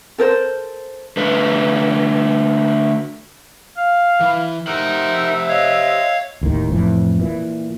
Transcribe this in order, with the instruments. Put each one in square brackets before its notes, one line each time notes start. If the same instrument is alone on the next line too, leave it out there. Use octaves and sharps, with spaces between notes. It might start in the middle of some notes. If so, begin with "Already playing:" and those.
[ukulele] A4 A#4 C5
[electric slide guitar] D3 A3 B4
[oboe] F5
[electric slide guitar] E3
[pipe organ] D#4 A#4 [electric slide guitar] G4 C5 F#5 [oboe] E5
[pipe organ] C#5 F5 [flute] D#5
[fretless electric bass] D#1 D#2 A2 D#3
F2 A2 E3
A#2 E3